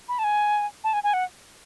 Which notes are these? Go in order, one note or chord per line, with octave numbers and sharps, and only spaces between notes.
B5
A5
G#5
A5
G#5
G#5
F#5